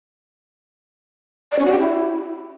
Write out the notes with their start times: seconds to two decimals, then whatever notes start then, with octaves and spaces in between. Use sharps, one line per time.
1.52 D5
1.59 C#4
1.66 F#4
1.72 G4
1.79 E4